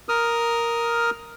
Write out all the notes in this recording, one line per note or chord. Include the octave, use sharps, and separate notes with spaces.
A#4 D#6 F6